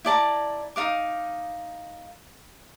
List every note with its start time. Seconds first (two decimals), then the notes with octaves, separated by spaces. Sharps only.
0.05 E4 D5 A5 A#5
0.76 D#4 D#5 F5 D6